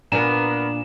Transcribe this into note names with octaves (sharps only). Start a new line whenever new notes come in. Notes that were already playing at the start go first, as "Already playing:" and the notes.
A#2 B3 D4 A#4 B4 G#5 A#5 E7